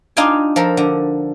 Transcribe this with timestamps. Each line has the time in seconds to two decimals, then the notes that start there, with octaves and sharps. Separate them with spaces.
0.17 D4 D#4 F4 F5 G5 G#5
0.56 F3 A4 A#4
0.77 D3